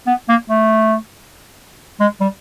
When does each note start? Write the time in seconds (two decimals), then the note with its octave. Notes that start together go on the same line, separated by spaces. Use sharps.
0.07 B3
0.29 A#3
0.50 A3
2.00 G#3
2.21 G3